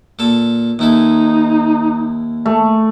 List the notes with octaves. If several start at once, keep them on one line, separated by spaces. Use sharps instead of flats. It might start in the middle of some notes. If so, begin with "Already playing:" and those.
A#2 A4 A5
D#2 D#4 E4 A4
A3